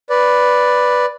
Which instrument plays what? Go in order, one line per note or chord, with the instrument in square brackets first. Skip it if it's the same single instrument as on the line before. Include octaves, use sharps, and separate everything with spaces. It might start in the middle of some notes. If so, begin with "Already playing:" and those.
[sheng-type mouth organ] B4 D5